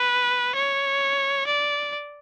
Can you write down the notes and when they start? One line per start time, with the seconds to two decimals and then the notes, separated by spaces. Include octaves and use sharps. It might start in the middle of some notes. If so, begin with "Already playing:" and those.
Already playing: B4
0.55 C#5
1.46 D5